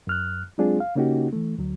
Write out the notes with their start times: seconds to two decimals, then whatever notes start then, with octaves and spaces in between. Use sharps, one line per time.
0.07 F#2 F6 F#6
0.58 F#3 G#3 C4 D4 F4 G#4
0.80 F5
0.95 C#3 A#3 C#4 D#4 F#4 G4
1.33 E3 A3
1.58 D2 F#3